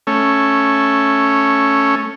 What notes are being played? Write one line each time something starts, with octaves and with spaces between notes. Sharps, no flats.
A3 C#4